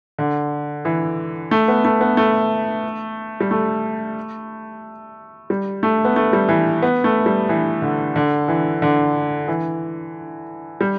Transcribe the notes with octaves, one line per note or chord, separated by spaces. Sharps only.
D3
E3
A3
B3
A3
B3
A3
G3
A3
G3
A3
B3
A3
G3
E3
B3
A3
G3
E3
D3
D3
E3
D3
E3
G3